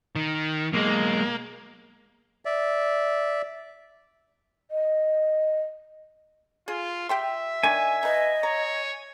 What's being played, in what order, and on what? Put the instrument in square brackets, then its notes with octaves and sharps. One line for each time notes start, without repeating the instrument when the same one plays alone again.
[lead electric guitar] D#3
[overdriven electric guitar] B1 G#3 [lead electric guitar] A#3
[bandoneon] D5 E5
[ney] D#5
[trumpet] F4 [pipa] G#4
[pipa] G4 G5 C6 [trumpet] E5
[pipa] D#3 D4 [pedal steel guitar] G#5
[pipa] D#4 B4 [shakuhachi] D#5
[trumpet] C#5 [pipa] A#5